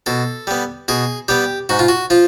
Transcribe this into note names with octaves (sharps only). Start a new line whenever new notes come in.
B2 A4
G3 B3
B2 G#4
G3 B3 G4
G#2 F#4
F4
F#4
F3 F4